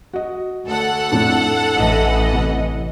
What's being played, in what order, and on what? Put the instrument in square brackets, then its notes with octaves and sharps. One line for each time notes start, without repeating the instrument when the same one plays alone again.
[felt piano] F#4 D#5
[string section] D2 [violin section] A4 F#5
[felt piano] F2 A2 D4
[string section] A1 E3 D#5
[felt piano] C2